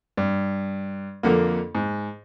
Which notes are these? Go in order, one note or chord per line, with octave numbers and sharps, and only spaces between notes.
G2
F2 D3 A#3
G#2